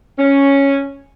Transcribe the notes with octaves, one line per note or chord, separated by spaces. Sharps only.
C#4